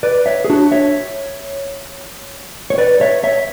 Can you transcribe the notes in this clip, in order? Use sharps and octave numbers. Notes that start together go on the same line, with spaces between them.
B4 D5
C#5 E5
G#4
D4 F#4
C#5 E5
C#5
B4 D5
C#5 E5
C#5 E5